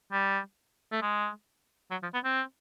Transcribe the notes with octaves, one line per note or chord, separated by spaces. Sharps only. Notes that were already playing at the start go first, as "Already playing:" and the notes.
G3
A3
G#3
F#3
F3
B3
C4